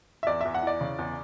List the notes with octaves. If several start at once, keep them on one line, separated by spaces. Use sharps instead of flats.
E5
E2 D5
E2 E5
F#5
E3 D5
C#3
E2